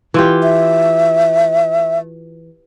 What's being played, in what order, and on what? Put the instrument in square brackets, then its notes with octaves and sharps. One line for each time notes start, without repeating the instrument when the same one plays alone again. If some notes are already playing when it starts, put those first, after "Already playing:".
[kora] E3 F4 G4
[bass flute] E5